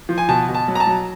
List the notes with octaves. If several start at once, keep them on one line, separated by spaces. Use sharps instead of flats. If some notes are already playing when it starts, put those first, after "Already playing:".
F3
G#5
B2 A5
B2
A5
F#3
A#5
A5
F#3